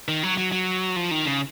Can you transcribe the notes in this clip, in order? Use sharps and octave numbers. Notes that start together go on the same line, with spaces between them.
D#3
F#3
F#3
F#3
F3
D#3
C#3